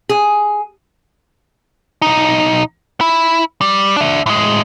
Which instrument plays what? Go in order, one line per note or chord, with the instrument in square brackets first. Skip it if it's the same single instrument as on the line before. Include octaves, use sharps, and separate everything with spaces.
[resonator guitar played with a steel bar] G#4
[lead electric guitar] B1 D#4
E4
G3
D4 E5
A2 G#3